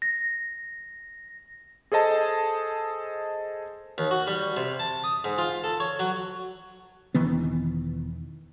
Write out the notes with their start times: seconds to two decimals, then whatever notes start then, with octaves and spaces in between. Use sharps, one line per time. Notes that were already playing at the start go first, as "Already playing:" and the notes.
0.02 A#6
1.92 G#4 A4 C5 D#5 A5
3.98 D#2
4.11 F#4
4.27 G3
4.57 C3
4.79 A5
5.04 D#6
5.24 G#2
5.38 F4
5.64 A4
5.80 C#5
5.99 F#3
7.14 E1 D#3 E3 B3